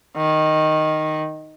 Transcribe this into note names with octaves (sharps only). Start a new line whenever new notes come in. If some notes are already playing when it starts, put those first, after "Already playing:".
D#3